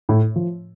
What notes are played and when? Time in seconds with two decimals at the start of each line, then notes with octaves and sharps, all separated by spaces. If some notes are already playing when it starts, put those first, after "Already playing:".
0.09 A2
0.36 F3